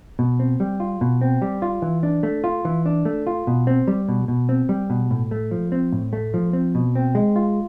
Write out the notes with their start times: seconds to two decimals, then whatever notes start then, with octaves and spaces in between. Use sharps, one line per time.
0.19 B2
0.40 C4
0.60 G3
0.80 F4
1.01 B2
1.21 C4
1.42 G3
1.62 F4
1.82 E3
2.03 D4
2.23 A3
2.44 F4
2.65 E3
2.86 D4
3.05 A3
3.27 F4
3.47 B2
3.67 C4
3.87 G3
4.08 B2
4.28 B2
4.49 C4
4.69 G3
4.90 B2
5.11 A2
5.31 A3
5.51 F3
5.72 C4
5.93 A2
6.13 A3
6.34 F3
6.53 C4
6.75 B2
6.95 C4
7.15 G#3
7.36 F4